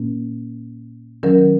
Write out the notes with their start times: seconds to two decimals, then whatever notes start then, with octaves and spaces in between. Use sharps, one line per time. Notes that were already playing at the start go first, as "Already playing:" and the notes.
Already playing: A#2 A#3 C#4
1.23 D#3 F#3 C#4 A#4